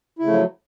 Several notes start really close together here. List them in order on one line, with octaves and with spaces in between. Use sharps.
E4 C#3 A3 F3 F#3